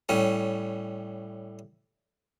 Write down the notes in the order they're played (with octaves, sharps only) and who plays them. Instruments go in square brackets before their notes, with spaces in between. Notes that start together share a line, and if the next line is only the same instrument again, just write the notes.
[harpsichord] A2 G3 C#4